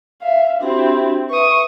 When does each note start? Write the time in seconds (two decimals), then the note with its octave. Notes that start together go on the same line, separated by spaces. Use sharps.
0.21 E5 F5
0.60 C4 D4 E4 F#4 G4
1.30 B4 E5 C#6 D#6